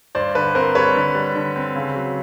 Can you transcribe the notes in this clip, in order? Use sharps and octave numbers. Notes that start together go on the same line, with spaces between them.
G2 C5 D5
D3 B4
C4 A#4 C5
G3 B4 C#5
D3
G3
D3
C4
C#3
F#3